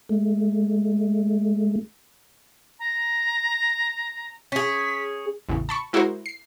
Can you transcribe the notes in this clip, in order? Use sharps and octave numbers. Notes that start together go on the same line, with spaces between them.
G#3 A3
A#5
C#4 G#4 B6
A1 E2 C#3
A5 B5 C#6
G#3 E4 F#4 G#4 A#4 C5
C7